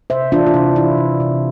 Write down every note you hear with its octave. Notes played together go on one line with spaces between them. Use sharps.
C3 C5 E5
E3 D4 F4
F4
C3 E4
E3 E4
C3
C3